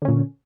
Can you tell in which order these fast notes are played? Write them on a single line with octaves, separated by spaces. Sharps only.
D3 C#4 A#2